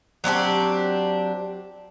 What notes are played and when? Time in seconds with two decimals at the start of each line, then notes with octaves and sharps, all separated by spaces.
0.24 F#3 C4 D4 G4